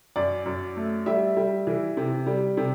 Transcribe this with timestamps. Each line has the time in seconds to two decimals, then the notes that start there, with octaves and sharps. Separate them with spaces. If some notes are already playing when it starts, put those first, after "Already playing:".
0.16 F#2 D5
0.46 F#2
0.77 A3
1.06 G3 E5
1.37 G3
1.67 E3
1.97 C3
2.27 G3
2.57 C3